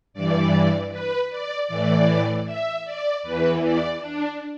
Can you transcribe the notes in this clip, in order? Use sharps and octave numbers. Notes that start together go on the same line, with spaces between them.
G2 E3 D5
B4
D5
A2 E3 D5
E5
D5
E2 E3 B4
D5
D4